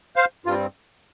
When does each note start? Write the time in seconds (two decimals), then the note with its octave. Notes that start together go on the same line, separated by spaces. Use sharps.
0.16 C5 F5
0.46 G2 G3 C4 F4